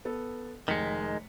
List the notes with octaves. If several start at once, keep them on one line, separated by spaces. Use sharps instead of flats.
B3 A4
F1 D#3 G#3 B6 C#7